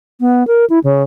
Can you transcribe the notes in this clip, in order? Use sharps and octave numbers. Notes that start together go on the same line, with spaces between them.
B3
A#4
E4
C#3